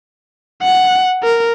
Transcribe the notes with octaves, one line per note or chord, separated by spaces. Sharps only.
F#5
A#4